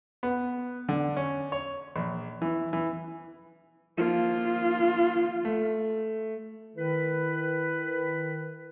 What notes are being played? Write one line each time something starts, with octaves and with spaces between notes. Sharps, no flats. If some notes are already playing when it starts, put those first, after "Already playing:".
B3
D3
C#4
C#5
A#1
E3
E3
F3 A#3 F4
A3
D#3 E4 B4